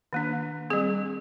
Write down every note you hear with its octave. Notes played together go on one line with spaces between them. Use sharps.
D#3 A#3 D4
G3 C4 G#4